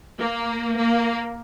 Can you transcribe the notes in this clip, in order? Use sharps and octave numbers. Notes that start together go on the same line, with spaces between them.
A#3
A#3